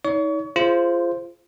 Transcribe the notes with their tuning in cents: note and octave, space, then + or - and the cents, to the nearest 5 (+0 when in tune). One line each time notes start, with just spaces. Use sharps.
D#4 +35 C#5 +40 C#6 +35
F4 -25 G#4 +5 C5 +0